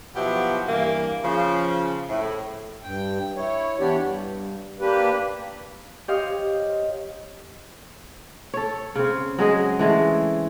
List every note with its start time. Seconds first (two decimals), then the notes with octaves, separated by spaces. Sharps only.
0.15 B2 F3 F#3 B3 E4 G4
0.68 G2 E3 A#3
1.23 C#3 F3
2.09 A2
2.83 G2 G5
3.37 E4 C#5
3.80 E3 B3 D4 G4 C#5 D5
3.99 G2
4.80 A#3 D4 G4 B4
6.08 G4 C5 C#5 D#5 F5 D#6
8.54 A4 C#5
8.95 C#3 C4
9.38 F#3 G#3 G#4 D#5
9.79 E3 G#3 A3